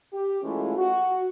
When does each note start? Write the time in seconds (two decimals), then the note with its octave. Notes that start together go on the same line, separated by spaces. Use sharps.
0.13 G4
0.42 E3 G#3 A3 C#4 F4
0.76 F#4